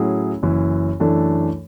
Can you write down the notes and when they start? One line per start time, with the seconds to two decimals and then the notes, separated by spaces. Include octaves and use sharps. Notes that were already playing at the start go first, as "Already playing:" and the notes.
Already playing: A2 F#3 C#4 E4 G#4
0.42 F#1 F#2 E3
1.00 F#2 E3 A3 D4 A4